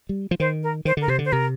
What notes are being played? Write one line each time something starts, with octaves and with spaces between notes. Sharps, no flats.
G3
F3
D#3 C5
A#4
D#3 C5
D3 A#4
C3 C5
D3
C5
C3 A#4